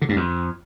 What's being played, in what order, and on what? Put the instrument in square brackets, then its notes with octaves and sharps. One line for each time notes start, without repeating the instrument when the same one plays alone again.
[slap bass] D3
G2
F2